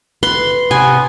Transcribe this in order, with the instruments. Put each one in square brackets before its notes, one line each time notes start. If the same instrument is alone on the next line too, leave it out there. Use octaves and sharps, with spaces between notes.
[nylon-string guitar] B4 [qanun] C6
[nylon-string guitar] C3 [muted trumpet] B3 [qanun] G#5